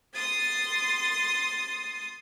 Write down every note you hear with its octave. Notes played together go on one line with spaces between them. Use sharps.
C6 D#6 A6